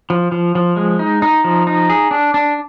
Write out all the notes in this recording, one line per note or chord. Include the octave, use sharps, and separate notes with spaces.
F3
F3
F3
G#3
D#4
D#4
F3
D#4
G#4
D4
D4